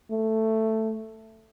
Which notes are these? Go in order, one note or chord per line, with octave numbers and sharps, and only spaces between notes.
A3